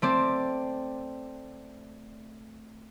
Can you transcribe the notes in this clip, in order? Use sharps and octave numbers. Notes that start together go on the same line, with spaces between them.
A3 C4 D5